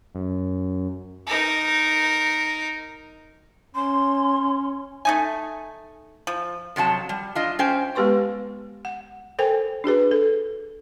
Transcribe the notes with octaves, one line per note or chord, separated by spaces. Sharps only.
F#2
D#4 A#4
C#4 C6
A3 D#4 G#5
F3
F2 C3 F#3 A5
G3
D4 F4 D#5
C#4 C5 G5
G#3 B3 G4 B4 C6 C#6
F#5
A4 A#4 C5 G5 G#5
D4 F#4 G#4 B4
A4